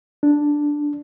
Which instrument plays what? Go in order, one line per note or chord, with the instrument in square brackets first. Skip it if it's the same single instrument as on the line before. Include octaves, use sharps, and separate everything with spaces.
[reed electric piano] D4